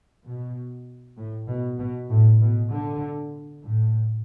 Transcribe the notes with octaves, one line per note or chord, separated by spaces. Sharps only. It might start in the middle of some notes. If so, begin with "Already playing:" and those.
B2
A2
B2
B2
A2
B2
D3
A2